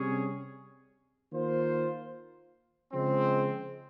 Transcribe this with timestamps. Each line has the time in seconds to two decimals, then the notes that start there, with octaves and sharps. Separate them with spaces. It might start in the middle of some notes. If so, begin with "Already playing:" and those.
Already playing: C3 G3 C#4 G#4 C#5
1.32 D#3 A#3 F4 C5
2.92 C#3 F3 G#3 C4